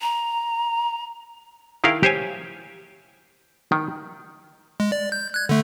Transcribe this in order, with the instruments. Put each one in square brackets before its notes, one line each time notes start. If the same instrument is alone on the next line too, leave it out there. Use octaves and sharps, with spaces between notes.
[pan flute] A#5
[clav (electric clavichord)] D#3 E4 G#4 A#4 F5 G5
G4 C5 C#5 G#5
D#3
[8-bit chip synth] G#3
D5
G6
F#6 G#6
D3 A3